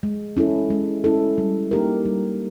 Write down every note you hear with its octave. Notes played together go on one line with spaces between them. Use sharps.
G#3
C#4 E4 A4
G#3
C#4 E4 A4
G3
A#3 D#4 G4 A#4
G3